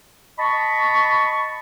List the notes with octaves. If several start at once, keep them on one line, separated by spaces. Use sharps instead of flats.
D#5 A5 B5 C#6